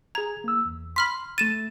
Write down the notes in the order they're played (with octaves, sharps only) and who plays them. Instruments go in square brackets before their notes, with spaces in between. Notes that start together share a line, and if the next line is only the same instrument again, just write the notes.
[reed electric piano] G#4 G#6 [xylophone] A#5
[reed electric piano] A#3 E6
E2
[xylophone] B5 F6 B6 [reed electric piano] C6
[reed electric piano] A3 A6 [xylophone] D#7 E7